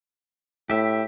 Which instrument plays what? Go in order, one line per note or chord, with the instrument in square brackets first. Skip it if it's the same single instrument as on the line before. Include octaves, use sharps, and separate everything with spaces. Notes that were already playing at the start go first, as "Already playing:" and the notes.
[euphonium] A2 [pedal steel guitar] G4 E5